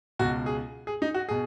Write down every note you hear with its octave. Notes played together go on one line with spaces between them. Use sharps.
C#2 B2 F#4
G#4
G#4
D#4
F#4
B2 G#4